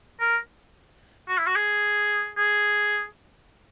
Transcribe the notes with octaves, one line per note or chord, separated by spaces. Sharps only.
A#4
F#4
E4
F#4
G#4
G#4